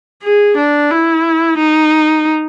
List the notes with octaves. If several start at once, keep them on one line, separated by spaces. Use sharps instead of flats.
G#4
D4
E4
D#4